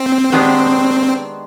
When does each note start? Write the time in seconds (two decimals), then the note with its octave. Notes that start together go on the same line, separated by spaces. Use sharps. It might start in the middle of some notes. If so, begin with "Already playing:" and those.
Already playing: C4
0.32 D#3 G#3 B3 D4 G4